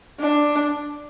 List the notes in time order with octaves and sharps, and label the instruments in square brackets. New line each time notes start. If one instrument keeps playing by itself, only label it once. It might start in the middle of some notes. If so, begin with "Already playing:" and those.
[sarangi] D4